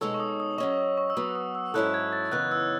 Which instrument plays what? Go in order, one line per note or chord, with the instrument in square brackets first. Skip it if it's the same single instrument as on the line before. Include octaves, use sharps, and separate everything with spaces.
[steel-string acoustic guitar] B2 G#3 D#4 A4 C#5 [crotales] E6
[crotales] C#6
D#6
D#6
[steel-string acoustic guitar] F#3 C#4 G#4 D#5 [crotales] C#6
[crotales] D#6
C#6
E6
[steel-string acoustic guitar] F#3 B3 F#4 [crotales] D#6
[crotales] D#6
E6
[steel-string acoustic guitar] G#2 F#3 C#4 E4 A4 [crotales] F#6
[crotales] G#6
A6
[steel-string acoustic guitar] F#2 C#3 E3 B3 D#4 [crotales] F#6
[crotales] E6